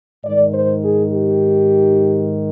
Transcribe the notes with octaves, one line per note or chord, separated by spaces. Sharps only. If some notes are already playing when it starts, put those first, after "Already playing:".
G#2 D#3 D5
C5
G#4
G4